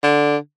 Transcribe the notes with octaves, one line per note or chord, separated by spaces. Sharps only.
D3